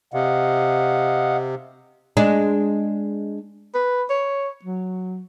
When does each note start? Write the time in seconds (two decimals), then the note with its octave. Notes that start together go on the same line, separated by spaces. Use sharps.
0.14 C3 D#5 F5 F#5
2.17 G#3 D4
3.74 B4
4.09 C#5
4.64 F#3